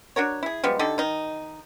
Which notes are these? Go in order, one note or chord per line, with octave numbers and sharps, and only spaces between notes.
D4 F#4 A#4 C#5
E4 G#4
F3 G3 G#3 B3
D3 D#4 G4 A4
D#3 D#4